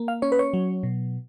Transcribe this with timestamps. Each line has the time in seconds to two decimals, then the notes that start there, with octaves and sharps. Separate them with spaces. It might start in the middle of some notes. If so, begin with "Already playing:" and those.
Already playing: A#3
0.08 F5
0.22 C#4 C#5
0.32 B4
0.39 C#5
0.54 F#3
0.83 B2